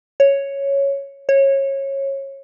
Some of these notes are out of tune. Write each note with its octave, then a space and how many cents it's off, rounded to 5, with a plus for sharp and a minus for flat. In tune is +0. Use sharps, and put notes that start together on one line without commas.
C#5 +0
C#5 -20